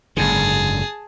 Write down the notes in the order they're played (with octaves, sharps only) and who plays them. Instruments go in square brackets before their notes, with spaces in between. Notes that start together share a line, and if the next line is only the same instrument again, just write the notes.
[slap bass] F#1 G#2 D3 [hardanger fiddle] G#4 A5